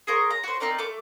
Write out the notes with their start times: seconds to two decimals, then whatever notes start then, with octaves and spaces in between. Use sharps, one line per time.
0.07 G#4 A#4 C5 C#6
0.31 A#5
0.43 F#4 C5
0.60 C4 D#4 A#4 D5
0.79 A3 D6